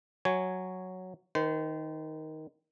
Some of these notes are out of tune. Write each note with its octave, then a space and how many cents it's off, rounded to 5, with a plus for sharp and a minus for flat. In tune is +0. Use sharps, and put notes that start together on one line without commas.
F#3 +0 C#5 +0 G#5 +0
D#3 +10 C5 -30